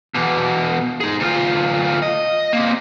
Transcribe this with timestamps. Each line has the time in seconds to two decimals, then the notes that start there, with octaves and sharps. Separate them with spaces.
0.15 E2 B2
1.00 D#4 G#4
1.20 D2 F4
2.02 D#5
2.53 A#3 C4